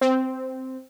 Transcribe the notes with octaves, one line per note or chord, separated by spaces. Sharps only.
C4